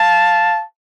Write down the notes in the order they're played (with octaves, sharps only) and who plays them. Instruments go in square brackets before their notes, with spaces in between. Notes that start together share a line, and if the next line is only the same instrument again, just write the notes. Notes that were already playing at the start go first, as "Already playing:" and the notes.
Already playing: [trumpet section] F5 A5